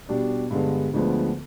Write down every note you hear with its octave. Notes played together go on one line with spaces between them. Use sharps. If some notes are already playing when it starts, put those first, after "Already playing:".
B2 G3 D4 G4
G2 D3 G#3 B3
D2 D3 F3 G#3 B3